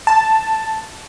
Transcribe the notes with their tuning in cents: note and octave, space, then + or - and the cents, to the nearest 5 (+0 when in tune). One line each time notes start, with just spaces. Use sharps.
A5 +5